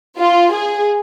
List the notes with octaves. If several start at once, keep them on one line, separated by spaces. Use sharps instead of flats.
F4
G#4